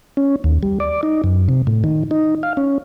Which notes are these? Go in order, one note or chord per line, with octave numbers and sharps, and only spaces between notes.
C#4
D#2
G3
D5
D#4
F#2
C3
A2
D#3
D#4
F5
C#4